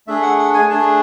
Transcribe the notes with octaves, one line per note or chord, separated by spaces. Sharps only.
A3 D4 G#4 E5
F#5
F#5
G#5
A3 D4 G#4 A5